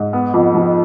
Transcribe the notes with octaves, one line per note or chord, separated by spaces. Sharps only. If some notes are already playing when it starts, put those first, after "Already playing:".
Already playing: G#2
B3
F2
F3